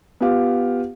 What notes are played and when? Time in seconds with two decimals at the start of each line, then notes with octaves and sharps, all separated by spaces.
0.21 B3 F4 G4 F5